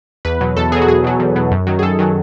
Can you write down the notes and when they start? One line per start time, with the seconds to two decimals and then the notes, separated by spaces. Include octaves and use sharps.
0.25 E2 B4
0.41 B2 F#3
0.57 E2 A4
0.72 B2 F#3 G#4
0.82 F#4
0.88 E2 G#4
1.04 B2 F#3
1.20 E2
1.36 B2 F#3
1.51 F#2
1.67 D#3 F#3
1.79 G#4
1.82 F#2 A4
1.99 D#3 F#3